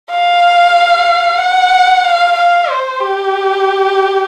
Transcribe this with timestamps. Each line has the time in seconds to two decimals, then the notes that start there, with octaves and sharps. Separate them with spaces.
0.11 F5
1.39 F#5
2.05 F5
2.36 F5
2.69 C5
3.01 G4